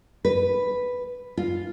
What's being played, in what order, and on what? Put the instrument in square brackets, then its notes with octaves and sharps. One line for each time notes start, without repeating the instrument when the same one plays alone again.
[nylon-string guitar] B4
F4